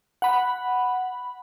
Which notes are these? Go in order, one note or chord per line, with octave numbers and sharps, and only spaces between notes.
F#5 B5